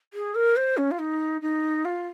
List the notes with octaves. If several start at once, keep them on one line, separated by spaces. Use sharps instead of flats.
G#4
A#4
C5
C#4
F4
D#4
D#4
F4